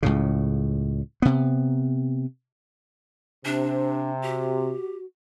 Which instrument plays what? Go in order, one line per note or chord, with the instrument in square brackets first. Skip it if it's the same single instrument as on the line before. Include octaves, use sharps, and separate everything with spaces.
[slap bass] C#2 A2 C#3
C3 B3
[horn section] C3 [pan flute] D4 [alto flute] C5
[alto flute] F#4 [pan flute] G4